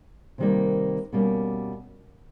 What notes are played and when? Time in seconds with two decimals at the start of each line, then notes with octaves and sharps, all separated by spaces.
0.38 C3 D#3 G3 A#3
1.12 B2 G3 A#3 C#4